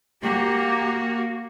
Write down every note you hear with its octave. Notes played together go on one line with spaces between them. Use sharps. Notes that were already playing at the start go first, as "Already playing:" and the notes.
A#3 F#4 G4